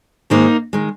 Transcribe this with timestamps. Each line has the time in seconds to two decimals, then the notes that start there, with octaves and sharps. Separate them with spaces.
0.30 G#2 D#3 G#3 A#3 D#4
0.73 D#3 G#3